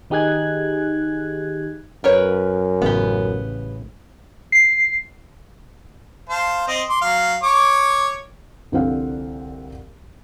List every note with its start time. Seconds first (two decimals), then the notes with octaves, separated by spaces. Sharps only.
0.10 D#3 D#4 G4 G#4 F#6 G#6
2.04 F#2 A#4 B4 C#5
2.82 A1 C#3 B3 G4
4.52 C7
6.29 C5 F5 A5
6.68 C4 D#5
6.89 C6 D6
7.01 F#3 F5
7.43 C#5 C#6 D6
8.72 C2 D3 F3 C4 F5 F#5